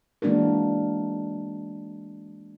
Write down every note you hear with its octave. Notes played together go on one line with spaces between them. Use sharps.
E3 G#3 A#3 D4 F#4 A#4